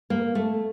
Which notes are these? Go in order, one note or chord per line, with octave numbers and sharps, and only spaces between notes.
A#3
A3